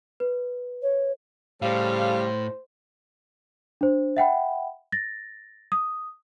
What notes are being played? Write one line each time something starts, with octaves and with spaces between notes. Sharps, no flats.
B4
C#5
A2 C#3 G3 A4 C5 F5
D4 C5
E5 F#5 G5 B5
A6 A#6
D#6